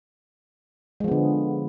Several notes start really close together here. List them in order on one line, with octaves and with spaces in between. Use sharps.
G#3 F3 B3 D3